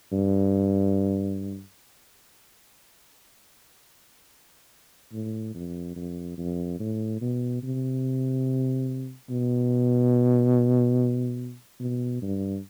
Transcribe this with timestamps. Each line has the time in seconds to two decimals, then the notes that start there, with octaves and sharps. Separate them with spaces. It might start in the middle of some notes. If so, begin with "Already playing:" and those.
0.12 G2
5.13 A2
5.54 F2
5.96 F2
6.38 F2
6.80 A2
7.21 B2
7.63 C3
9.30 B2
11.80 B2
12.22 G2